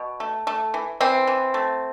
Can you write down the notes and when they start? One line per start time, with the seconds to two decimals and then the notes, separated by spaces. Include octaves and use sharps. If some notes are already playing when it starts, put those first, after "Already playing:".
Already playing: B2
0.20 A3
0.47 A3
0.74 E3
1.00 E3 C4
1.27 E3
1.54 A3